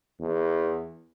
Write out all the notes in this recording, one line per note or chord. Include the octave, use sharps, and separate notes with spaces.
E2